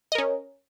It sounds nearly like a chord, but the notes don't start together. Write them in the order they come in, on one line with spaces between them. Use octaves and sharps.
D#5 A#4 C#4